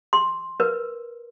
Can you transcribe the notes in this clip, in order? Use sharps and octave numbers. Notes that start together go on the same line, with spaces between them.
C6
A#4 B4